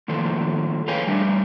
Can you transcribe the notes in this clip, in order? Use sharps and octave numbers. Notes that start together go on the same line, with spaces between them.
A2 D#3 F3 A#3 A4
G#4 B4 C#5 F5 G5 G#5
G3 A3 D4